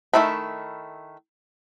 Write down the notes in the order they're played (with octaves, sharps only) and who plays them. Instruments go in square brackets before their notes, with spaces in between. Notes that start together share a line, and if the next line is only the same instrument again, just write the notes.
[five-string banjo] D#3 F#3 A3 E4 B5